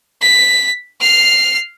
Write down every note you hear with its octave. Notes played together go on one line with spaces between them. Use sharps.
B6
F6 C7